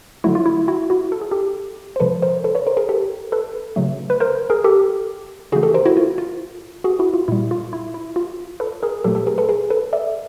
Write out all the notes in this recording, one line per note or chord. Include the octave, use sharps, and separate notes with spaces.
D3 F#3 A3 E4 F#4
F4
E4
E4 F#4
E4 F#4
A4
G#4
G4 A4
C5
C3 F3 G#3 A4 B4
A#4 C5
A4 B4
B4 C#5
A#4 C5
G#4 A#4
G4 A4
A4 B4
C#3 F#3 A3
B4
A#4 C5
G#4 A#4
G4 A4
C#3 E3 A3 F#4 G#4
G4 A4
A#4 C5
E4 F#4
F4
F4
F#4 G#4
E4 F#4
F4
A#2 G3 E4
F4
E4
E4
F4
A4 B4
G#4 A#4
A#2 F#3 A3 G4 A4
G4 A4
G#4 A#4
A4 B4
G#4 A#4
A4 B4
D5 E5